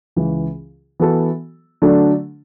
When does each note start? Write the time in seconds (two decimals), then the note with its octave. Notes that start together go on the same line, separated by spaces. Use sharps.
0.16 C#2 C#3 E3
1.00 E3 B3 F#4 A4
1.82 D3 F#3 A3 D4